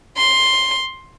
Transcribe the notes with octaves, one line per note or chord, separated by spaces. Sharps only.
C6